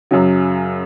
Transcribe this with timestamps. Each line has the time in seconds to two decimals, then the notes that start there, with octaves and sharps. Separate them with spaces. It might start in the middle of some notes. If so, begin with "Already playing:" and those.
0.11 F#2 C#3 F#3